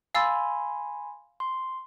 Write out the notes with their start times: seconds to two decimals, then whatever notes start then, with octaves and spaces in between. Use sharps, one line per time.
0.15 F5 G#5 B5 C6 E6 A6
1.40 C6